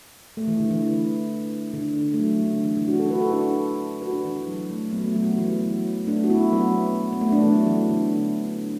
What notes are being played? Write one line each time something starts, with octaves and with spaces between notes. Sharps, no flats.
A3
E3
D3
E3
D3
A3
F#3
D3
E3
E3
D4 F#4
E4 A4
F#4 B4
E4 A4
D4 F#4
F#4 B4
D4 F#4
E3
E3
F#3
A3
F#3 B3
A3
F#3 B3
F#3
E3
E3
F#3
A3 D4
F#4
B3 E4
F#3 B3
B3
A3
A3 D4
E3
F#3
E3
D3